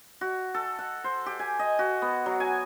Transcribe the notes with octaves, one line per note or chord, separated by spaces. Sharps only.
F#4
A4
F#5
C5
G4
G#5
D#5
F#4
B3
F#3
G#5